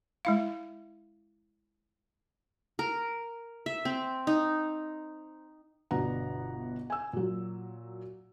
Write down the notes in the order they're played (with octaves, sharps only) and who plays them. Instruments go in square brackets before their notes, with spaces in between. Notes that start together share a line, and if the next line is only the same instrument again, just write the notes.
[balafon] G#3 E4 F5
[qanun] A#4
E5
C4
D#4
[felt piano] G1 B2 B3 D4 F#5 A#5
G#5 E6
A#2 F#3